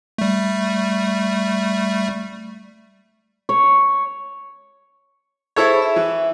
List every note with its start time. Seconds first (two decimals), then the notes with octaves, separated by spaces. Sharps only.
0.18 G3 A3
3.49 C#5
5.56 E4 G#4 A4 C5 C#5 B5
5.82 E5
5.96 E3